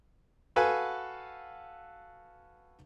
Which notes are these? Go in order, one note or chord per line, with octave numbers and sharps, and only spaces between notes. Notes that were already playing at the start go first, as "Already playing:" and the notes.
F#4 A4 B4 F5 F#5 G#5